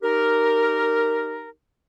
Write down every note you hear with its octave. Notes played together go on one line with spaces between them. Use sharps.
D#4 G4 A#4